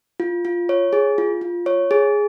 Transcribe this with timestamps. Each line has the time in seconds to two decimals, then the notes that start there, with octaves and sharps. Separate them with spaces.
0.20 F4
0.45 F4
0.69 C#5
0.93 G#4
1.18 F4
1.41 F4
1.66 C#5
1.91 G#4